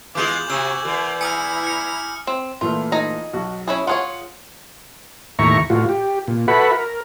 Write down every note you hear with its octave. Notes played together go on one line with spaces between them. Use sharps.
E3 G#3 B3 F4 G#4 D6 G6 F#7
C3 F#4 G#5 E6
E2 A#4
E4 G#5 A#5 D#6 F6 C#7
F6 C#7
C4
A#2 E3 A3 F4
D#4 G#4 A#5
B1 F#4
C#4 E4 G#4
F4 G#4 C#5 F#5
D#2 A2 E5 A#5 C#6
A2 F4 F#4
G4
A#2
F#4 A4 B4 E5 F#5 B5
A#4